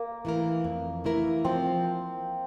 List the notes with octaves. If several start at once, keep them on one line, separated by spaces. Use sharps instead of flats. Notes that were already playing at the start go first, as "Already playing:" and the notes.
Already playing: A#3
E3 A3 E4 A#4
F2
E3 A3 E4 A#4
F3 C4